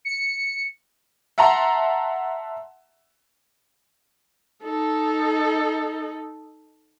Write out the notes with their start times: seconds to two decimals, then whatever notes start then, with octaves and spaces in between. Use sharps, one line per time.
0.05 C#7
1.38 E5 F#5 A5 A#5 C6
4.64 D#4 A4